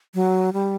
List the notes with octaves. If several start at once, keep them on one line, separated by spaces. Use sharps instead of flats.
F#3
G3